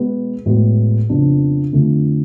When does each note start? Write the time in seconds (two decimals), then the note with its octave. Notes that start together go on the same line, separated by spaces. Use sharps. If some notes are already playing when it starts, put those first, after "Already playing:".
Already playing: B2 G#3 B3
0.46 A2 G#3 B3 F#4
1.09 F2 C#3 F3 B3 D4
1.73 F2 D3 F3 A3